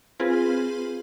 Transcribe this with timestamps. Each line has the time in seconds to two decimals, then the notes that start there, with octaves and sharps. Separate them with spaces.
0.20 C4 F4 G#4 B4